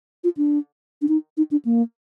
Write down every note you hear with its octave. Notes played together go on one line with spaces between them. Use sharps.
F4
D4
D4
D#4
D#4
D4
A#3